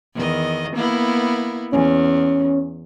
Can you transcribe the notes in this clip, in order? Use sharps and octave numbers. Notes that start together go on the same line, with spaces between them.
E2 D#3 D#5
A#3 B3 E4
E2 C#4